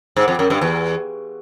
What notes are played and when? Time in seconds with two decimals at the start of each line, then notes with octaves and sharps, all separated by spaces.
0.16 G#2
0.28 F2
0.39 F#2
0.50 G2
0.61 E2